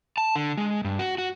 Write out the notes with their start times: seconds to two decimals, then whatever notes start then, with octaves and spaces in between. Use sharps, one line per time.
0.18 A5
0.36 D3
0.57 G#3
0.84 G2
0.99 F#4
1.18 F#4